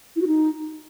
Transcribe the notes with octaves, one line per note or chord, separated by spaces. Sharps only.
E4
F#4
D#4